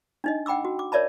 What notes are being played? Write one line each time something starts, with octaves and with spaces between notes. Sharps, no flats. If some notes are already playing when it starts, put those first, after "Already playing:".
D4 D#4 D#5
F#5 G5 B5 D6 E6
F#4
D6
A#4 C#5 D5 E5 A5 B5